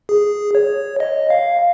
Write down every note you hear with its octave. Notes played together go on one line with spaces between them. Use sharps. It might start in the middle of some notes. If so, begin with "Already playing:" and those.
G#4
C#5
D#5
F5